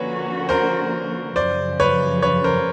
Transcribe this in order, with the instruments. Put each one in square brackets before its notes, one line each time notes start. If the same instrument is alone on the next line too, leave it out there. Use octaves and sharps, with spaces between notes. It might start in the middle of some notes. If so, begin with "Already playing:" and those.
Already playing: [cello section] D3 F3 A#3 C#4 F#4 [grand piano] B4 C#5
[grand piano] A#4 C5
[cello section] F#2 C#3 F3 [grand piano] C5 D5
[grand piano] B4 C#5
B4 C#5
A#4 C5